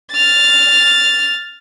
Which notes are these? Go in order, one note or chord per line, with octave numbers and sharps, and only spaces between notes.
F6 A6